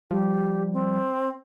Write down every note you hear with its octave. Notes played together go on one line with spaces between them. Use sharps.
F3 G3 G4
C4